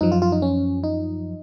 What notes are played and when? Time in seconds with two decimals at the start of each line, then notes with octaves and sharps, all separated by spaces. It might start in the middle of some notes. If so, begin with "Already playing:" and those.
0.01 F#2 F3 D#4
0.12 F4
0.22 F4
0.32 D#4
0.42 C#4
0.84 D#4